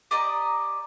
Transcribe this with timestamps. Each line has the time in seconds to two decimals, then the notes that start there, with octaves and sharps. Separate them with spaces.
0.11 G4 D5 D#5 A#5